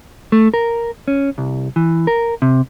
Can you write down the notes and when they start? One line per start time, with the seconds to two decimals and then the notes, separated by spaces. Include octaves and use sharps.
0.32 A3
0.54 A#4
1.08 C#4
1.38 C2
1.76 E3
2.07 A#4
2.42 C3